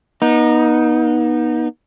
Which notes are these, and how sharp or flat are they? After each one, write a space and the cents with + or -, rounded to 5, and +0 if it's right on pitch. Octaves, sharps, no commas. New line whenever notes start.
B3 -35 D#4 +0